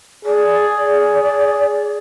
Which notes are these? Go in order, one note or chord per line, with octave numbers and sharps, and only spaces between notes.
G#4 D5